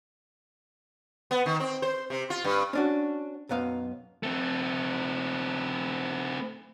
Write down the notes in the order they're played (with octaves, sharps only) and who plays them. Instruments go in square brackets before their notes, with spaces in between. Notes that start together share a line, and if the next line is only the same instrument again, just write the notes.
[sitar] B3
D#3
C4
C5
C3
F4
G2
[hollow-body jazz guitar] C#4 D4 F#4
B1 F#2 B3 F5
[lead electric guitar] A3 C4